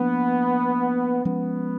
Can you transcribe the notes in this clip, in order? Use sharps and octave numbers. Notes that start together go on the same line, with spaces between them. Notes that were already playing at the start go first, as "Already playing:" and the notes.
Already playing: F3 A#3 B3 D4
F3 G#3 B3 C#4